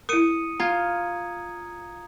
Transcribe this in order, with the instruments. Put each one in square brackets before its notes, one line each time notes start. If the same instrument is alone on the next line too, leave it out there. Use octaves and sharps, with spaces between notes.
[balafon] E4 A#4 [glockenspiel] D#6 C#7 D#7
[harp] F4 [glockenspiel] A#5 G#6